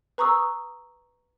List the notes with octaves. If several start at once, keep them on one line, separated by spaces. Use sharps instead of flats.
B4 A#5 C#6 D#6 E6